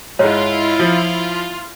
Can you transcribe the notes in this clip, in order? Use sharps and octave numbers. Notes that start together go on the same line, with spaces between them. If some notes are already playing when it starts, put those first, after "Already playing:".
G#2 G#3 E4 F4 C#5
F3